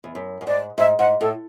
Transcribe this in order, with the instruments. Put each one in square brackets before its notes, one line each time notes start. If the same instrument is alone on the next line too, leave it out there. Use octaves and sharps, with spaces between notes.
[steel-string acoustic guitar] E2
F#2
F#2
[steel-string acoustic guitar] G#2 [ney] D5
[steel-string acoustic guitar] G#2 [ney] E5
[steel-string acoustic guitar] G#2 [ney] F#5
[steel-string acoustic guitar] A2 [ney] A4